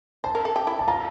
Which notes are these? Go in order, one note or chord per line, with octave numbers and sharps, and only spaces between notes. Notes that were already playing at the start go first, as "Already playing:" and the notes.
C5 A5
A#4
A4
G4
E4
A5
F4 A#5